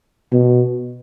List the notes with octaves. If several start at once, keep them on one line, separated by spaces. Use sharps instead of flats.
B2